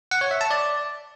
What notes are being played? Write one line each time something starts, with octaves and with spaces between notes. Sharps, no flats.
F#5
C#5
E5
A5
D5